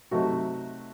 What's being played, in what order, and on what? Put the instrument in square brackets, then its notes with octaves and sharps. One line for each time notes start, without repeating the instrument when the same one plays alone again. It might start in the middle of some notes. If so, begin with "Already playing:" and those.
[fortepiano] C3 F#3 A3 D#4 F#4